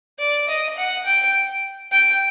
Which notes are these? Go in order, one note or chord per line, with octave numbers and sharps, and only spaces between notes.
D5
D#5
F#5
G5
G5